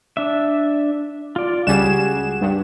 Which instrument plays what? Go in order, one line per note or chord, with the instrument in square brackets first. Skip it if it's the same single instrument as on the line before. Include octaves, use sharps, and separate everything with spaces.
[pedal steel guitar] D4 E5
F4 D5
[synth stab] C#2 G3 E7 [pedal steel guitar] F#4 G#4
[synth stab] G2